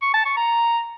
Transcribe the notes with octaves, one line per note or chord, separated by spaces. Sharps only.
C#6
A5
C#6
A#5